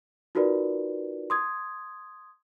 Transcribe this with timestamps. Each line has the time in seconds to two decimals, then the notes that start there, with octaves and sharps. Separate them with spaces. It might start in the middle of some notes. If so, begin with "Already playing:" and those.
0.35 D#4 F4 F#4 A#4 B4 D5
1.30 C6 D#6 G#6